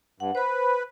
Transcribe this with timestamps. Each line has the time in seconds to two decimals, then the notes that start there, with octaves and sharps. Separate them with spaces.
0.20 G2 F#5
0.35 B4 C5 B5